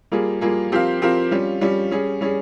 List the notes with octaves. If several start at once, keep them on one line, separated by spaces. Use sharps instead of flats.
G3 A#3 F4 G#4
G3 A#3 F4 G#4
F3 C4 G4 A#4 F5
F3 C4 G4 A#4 F5
G3 C#4 F4
G3 C#4 F4
G3 C#4 G#4
G3 C#4 G#4